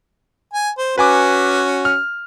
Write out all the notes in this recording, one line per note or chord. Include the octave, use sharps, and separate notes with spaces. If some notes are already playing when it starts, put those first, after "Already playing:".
G#5
C5
C#4 F#4 B4 G#5 D6
F6